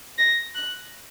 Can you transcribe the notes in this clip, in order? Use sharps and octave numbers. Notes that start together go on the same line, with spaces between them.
A#6
F#6